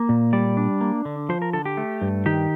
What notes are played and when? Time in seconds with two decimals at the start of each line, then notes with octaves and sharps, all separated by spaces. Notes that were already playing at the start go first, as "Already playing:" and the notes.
Already playing: A#3
0.09 A#2
0.33 G3 D5
0.57 D4
0.81 A#3
1.05 D3
1.29 F3 C5
1.42 A#4
1.53 D3 A4
1.65 G4
1.77 A3
2.02 G2
2.26 D#3 G4